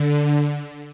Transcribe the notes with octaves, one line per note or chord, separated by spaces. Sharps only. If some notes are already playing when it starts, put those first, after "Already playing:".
Already playing: D3